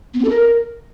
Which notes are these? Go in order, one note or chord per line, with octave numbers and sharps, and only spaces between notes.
B3
C4
A4
A#4